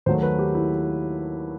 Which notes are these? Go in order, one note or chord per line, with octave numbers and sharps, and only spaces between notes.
D#2 D#3 F#3 A3 C5
B4
G4
E4